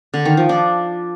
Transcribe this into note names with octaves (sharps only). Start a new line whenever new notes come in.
D3
D#3
F3
D4